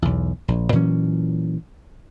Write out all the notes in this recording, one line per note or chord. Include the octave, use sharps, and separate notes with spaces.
B1 E2
A#1
A#2 E3 F#3 C#4